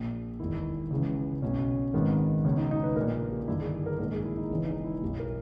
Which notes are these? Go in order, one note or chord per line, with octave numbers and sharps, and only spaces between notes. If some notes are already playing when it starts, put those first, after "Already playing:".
Already playing: A#1 A#2
E1 E2 D#3 E4
C#2 C#3 E3
B1 B2 C#4
G#1 G#2 D#3 B3
C#2 B2 C#4
D#4
D#4
B4
A#1 A#2 A#4
G4
G1 G2 D#3 E4
G#4
A#4
A#1 G#2 D#3 A#4
G#4
E4
D#4
E1 E2 C#3 E3 C#4
D#4
E4
B1 B2 G4
A#4